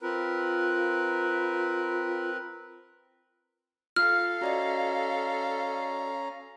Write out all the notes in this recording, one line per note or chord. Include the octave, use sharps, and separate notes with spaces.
C4 F4 A#4 B4
F4 A4 F5 F6
C#4 F#4 D5 D#5 A#5